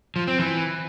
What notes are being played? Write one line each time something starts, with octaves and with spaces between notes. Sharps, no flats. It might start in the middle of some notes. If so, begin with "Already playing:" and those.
F3
C4
E3